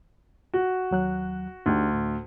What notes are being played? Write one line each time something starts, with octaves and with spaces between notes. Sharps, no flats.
F#4
D#2 F#3 F#6
D2 D4 D#4 G4
A2